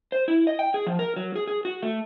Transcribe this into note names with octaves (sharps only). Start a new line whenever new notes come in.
C5
E4
D#5
G5
G#4
F3
A#4
F#3
G#4
G#4
F#4
A3